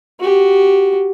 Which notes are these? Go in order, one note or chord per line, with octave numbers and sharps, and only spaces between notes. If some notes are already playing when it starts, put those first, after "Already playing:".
F#4 G4